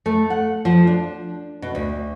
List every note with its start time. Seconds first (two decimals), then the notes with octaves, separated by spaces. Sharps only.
0.06 A3
0.30 F#5
0.65 F3
0.87 D4
1.62 B2
1.75 D2